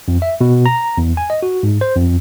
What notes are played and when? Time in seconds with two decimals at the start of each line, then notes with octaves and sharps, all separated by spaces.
0.08 F2
0.22 E5
0.41 B2
0.66 A#5
0.97 E2
1.17 G#5
1.30 D#5
1.43 F#4
1.63 G#2
1.81 C5
1.96 F2